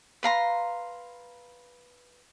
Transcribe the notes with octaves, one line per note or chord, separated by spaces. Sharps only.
B4 F5 A#5 C6